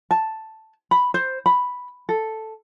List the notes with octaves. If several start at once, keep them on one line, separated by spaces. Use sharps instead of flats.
A5
B5
C5
B5
A4